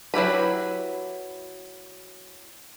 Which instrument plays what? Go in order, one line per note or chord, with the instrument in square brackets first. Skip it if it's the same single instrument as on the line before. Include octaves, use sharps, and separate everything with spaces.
[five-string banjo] F#3 E4 G4 B4